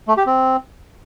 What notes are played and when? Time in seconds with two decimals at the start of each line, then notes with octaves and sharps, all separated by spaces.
0.08 A3
0.17 G4
0.26 C4